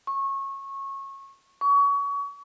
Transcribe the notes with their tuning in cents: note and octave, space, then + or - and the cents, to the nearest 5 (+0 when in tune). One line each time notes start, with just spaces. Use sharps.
C#6 -20
C#6 +30